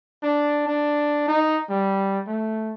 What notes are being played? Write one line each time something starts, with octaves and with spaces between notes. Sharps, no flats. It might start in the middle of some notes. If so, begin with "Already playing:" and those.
D4
D4
D#4
G3
A3